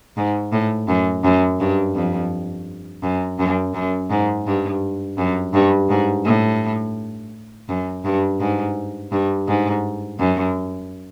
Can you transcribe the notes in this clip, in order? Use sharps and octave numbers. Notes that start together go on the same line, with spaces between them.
G#2
A2
F#2
F#2
G2
F2
F#2
F#2
F#2
G#2
G2
F#2
G2
G#2
A2
F#2
G2
G#2
G2
G#2
F#2